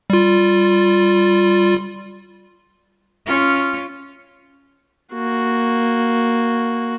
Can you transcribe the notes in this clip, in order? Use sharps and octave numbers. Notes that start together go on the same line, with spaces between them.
G3 F4
C#4 F4
A#3 F#4